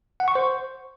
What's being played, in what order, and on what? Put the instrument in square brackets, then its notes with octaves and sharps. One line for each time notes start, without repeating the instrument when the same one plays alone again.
[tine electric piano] F#5
C#6
C5